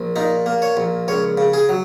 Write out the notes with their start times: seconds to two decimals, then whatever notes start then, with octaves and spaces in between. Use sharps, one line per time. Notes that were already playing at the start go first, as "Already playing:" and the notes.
Already playing: A#1
0.16 A#2 D#4
0.46 A#3
0.62 C#5
0.77 A#1
1.08 C#2 C#5
1.38 C#3
1.53 G#4
1.69 F#3